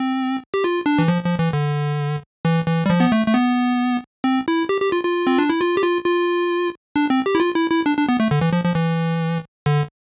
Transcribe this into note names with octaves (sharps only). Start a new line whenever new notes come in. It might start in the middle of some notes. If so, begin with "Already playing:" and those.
Already playing: C4
G4
F4
D4
E3
F3
F3
E3
D3
E3
E3
G3
F3
B3
A3
A3
B3
C4
E4
G4
G4
F4
F4
C4
D4
E4
F4
G4
F4
F4
D4
C4
G4
E4
F4
E4
E4
D4
D4
B3
A3
D3
E3
F3
F3
E3
D3